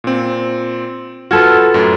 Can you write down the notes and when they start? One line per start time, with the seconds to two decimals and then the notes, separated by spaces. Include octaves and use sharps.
0.04 A#2 C4
1.31 F4 F#4 A4 B4 G#6 E7
1.74 F#2 A2